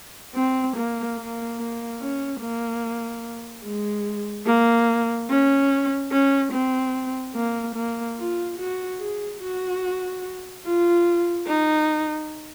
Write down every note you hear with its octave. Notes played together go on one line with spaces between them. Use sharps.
C4
A#3
A#3
A#3
C#4
A#3
G#3
A#3
C#4
C#4
C4
A#3
A#3
F4
F#4
G#4
F#4
F4
D#4